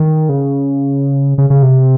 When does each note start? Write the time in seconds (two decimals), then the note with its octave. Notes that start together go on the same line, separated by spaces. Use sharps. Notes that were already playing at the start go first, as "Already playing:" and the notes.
Already playing: D#3
0.29 C#3
1.38 C#3
1.50 C#3
1.63 C3